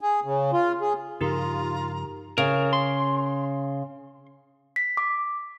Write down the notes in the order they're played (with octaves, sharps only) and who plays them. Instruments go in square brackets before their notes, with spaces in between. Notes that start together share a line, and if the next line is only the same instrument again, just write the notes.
[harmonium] G#4
C#3
F4
G#4
[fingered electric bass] G2 C#3 F3 [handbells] D#4 G4 A#4 [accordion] F4 [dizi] A#5
[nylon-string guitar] C#3 [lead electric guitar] A#4
[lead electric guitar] C6
[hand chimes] B6
D6